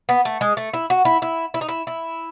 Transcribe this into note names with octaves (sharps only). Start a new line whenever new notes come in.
B3
A3
G#3
A3
E4
F#4
E4
E4
E4
D#4
E4
E4